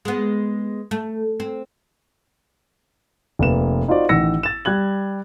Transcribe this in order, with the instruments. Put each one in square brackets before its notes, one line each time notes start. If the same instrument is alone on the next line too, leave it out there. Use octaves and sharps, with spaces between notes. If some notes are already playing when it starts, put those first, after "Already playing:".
[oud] G#3 B3
A3
C4
[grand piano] F1 A#3 B4 E7
D#4 F4 F#4 C5 D5
A1 D#3 F#5 E6 A#6 C#7
A6 E7
G3 F#6 G#6 F#7